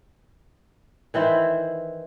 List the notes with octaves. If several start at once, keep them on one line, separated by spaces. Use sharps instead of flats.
D#3 E3 E4 C5